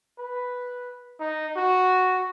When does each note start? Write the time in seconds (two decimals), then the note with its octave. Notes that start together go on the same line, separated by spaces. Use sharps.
0.19 B4
1.20 D#4
1.56 F#4